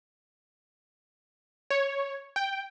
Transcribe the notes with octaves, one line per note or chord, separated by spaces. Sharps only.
C#5
G5